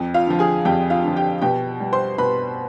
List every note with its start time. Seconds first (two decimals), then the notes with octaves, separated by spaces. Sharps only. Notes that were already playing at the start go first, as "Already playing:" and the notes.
Already playing: F2
0.14 F4 F5
0.27 D3 F3
0.39 G#4 G#5
0.65 F2 G4 G5
0.90 F4 F5
1.04 D3 F3
1.16 G4 G5
1.42 B2 G4 G5
1.80 G3
1.93 C5 C6
2.18 B2 B4 B5